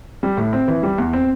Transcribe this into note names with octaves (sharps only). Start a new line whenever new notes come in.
G3
A2
C4
E3
G3
E2
C4